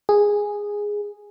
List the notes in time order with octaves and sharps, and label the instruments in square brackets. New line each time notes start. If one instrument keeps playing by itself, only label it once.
[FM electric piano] G#4